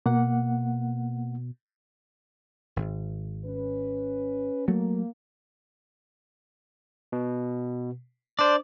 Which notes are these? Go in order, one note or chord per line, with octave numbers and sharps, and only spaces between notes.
B2 A#3 F#5
G#1
C#4 B4
F#3 A3 A#3
B2
D4 C5 D5